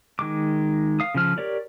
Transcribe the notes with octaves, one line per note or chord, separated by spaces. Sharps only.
D#3 G#3 D6
F5 D#6
C#3 F3 F6
G4 A#4 C#5 D5